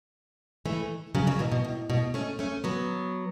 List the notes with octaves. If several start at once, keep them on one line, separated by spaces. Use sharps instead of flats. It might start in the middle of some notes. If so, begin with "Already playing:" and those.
E3 A3
C#3 F#3
C#3 F#3
B2 E3
B2
A2
B2
A3 C#4
A3 C#4
F#3 B3